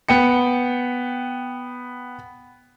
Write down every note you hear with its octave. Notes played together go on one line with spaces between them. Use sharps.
B3 G5 C#7